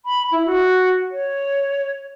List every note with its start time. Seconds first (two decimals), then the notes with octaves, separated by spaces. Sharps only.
0.06 B5
0.32 E4
0.46 F#4
1.11 C#5